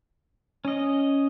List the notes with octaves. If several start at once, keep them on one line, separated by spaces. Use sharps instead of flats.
C#4 D#5